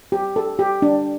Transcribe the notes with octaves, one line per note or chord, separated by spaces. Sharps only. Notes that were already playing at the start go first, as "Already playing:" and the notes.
G4
A4
G4
D4